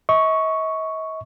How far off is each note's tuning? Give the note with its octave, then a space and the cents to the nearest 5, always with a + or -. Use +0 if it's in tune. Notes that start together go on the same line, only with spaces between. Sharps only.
D#5 +45 C#6 +0